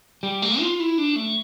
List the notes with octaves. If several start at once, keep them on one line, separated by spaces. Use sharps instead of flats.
G3
A3
F4
E4
D4
A3